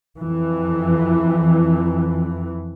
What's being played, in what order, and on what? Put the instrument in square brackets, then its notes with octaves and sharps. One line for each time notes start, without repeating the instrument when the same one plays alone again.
[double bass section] F2 E3